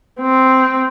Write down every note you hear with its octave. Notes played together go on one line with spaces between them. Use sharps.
C4